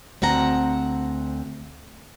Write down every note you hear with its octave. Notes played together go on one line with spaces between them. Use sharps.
D2 C4 F#5 A#5